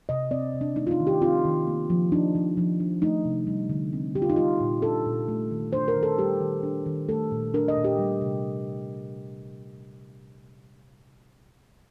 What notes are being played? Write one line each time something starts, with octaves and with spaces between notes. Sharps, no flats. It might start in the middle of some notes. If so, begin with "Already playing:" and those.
C3 D#5
C4 D5
C3
D4
A3 D#4
F4
D#4
D#3
G4
C4 F4
D#3
A#3
F3
D4 D#4
F3
F3
D4
A3 D#4
C3
G3
D3
C4
D3 G4
F4
D#4
G3 F4
A#2
D4 A4
A#2
A3
D#3
D4 C5
A#4
D#3
A4
G3 G4
D#3
D4
D#3
A3 A4
A#2
D4 A#4
D#5
A#2
G4
G3
C3